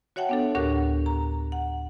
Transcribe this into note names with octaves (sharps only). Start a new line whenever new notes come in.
F#4 C#5 E5 F#5 G5 A5
B3 D4 A4
D2 A2 D4 G4 A#4 F#6
A#5
F#5